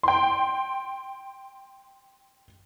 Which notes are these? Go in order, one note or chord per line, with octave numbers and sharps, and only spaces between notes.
G5 C6